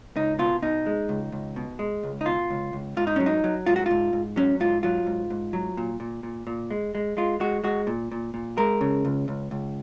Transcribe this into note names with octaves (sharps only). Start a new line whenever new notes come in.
C#2 D#4
B2 F4
B2 D#4
G#3
C#2
C#2
B2
G#3
C#2
D#4
B2 F4
C#2
C#2
G#2 F4
D#4
F#3 C#4
D#4
F#3
G#2 F4
F#4
G#2 F4
G#2
F#3 C#4
G#2 F4
F#3 F4
G#2
G#2
F#3
A#2
A#2
A#2
A#2
G#3
G#3
G#3 F4
G#3 F#4
G#3 F#4
A#2
A#2
A#2
G#3 A#4
C#3
C#2
C#2
C#2